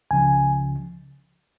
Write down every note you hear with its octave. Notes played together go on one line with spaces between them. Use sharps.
C#2 C#3 F3 G#5